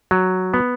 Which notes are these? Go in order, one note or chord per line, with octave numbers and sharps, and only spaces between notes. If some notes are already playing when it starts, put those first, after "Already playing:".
F#3
B3